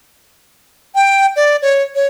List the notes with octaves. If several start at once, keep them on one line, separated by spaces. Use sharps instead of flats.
G5
D5
C#5
C#5